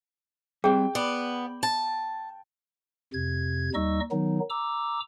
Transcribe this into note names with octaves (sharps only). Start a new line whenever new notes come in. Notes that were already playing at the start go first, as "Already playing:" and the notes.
G3 C4 G#4 G5
B3 D5
A5
F2 C3 G#6
D#2 G3 D#4 D#5 C#6 E6
D#3 F#3 B3 D#4
A#5 D6 E6